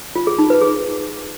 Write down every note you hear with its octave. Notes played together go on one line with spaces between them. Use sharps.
F4
G#4
D#4
B4
G#4